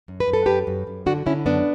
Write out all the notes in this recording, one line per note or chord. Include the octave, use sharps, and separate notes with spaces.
F#2
B4
F#2
A4
F#2 G4 B4
F#2
F#2
D3 D4 F#4
D3 C#4 E4
F#2 B3 D4